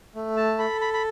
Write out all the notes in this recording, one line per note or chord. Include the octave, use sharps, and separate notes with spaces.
A3
A5
A4 B5
B5
B5